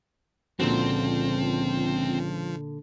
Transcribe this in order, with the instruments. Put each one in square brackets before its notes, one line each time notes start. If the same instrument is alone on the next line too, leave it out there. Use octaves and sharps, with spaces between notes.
[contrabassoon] C#2 [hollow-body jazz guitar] A#2 D3 F#4 [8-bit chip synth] F3 [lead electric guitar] C4